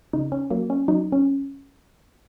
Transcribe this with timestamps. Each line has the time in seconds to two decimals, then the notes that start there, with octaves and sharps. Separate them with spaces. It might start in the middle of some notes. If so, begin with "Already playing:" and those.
0.13 C#3 D#4
0.32 C#4
0.50 F#3 A#3
0.70 C#4
0.88 F#3 D#4
1.12 C#4